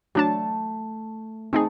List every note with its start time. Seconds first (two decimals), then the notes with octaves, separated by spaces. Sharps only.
0.15 F#3 A3 D4 A5
1.53 A3 C4 D#4 G#4